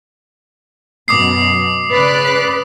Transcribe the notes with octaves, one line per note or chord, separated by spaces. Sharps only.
F#2 B2 D6 D#6 C7
C#3 B4 D5 F#6